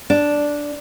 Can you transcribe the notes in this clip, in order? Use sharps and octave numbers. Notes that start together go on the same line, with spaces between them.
D4